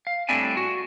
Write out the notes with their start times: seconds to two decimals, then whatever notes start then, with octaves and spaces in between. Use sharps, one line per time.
0.07 F5
0.29 A2 G3 C4 D4 E4 G#5
0.57 F#4